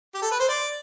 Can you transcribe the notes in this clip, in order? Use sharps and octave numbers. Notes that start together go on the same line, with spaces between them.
G4
A4
B4
C5
D5